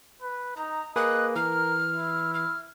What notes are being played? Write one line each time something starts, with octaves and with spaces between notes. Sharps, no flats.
B4
D#4 A#5
A#3 G#4 B4 D#5 F#6
E3 A#4 F6
E4
F6